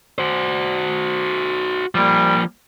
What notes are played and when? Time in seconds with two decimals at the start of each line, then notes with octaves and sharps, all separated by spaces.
0.18 F#4 C5
1.95 F3 G3 A#3